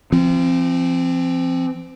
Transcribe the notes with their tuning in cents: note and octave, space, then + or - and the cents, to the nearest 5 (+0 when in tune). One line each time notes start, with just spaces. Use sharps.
F3 -35 C4 +5